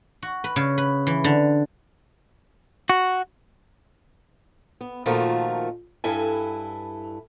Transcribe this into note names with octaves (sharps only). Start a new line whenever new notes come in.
F#4
B4
C#3
B4
E3
D3
F#4
B3
A#2 D#3 F3 A3 F#4 A#4
G2 E4 A4 B4 G#5